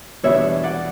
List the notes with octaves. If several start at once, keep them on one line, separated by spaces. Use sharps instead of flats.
E2 B2 G3 D4 C#5 E5
D5 F#5